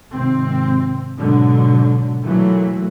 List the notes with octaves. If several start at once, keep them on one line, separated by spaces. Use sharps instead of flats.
G#1 C3 C4
G#2 B2 D3 F#3
A#2 E3 F#3 A3